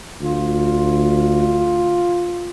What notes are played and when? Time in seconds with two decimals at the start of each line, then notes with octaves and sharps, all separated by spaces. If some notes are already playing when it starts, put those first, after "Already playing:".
0.21 D2 F4